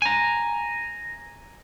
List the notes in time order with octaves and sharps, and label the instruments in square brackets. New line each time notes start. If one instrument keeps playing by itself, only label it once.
[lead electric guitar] G#5 A#5